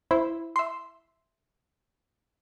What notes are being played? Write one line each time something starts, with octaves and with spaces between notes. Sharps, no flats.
E4 C5 E5
E5 C6